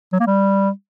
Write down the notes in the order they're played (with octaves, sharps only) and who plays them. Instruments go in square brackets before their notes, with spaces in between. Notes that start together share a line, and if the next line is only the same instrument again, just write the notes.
[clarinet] F#3
A#3
G3